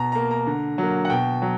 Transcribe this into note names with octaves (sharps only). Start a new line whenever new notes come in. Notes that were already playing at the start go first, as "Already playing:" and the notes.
Already playing: B2 A#5
A#3 A#5
A#5
D3
F#3 A#3
F#5
B2 G5
F#3